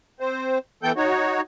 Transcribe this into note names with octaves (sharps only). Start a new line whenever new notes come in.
C4 C5
E3 B3 A4 G5 G6
D#4 F#4 C#5